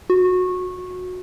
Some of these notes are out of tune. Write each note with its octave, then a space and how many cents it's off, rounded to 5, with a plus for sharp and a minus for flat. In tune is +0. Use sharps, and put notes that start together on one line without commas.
F#4 -20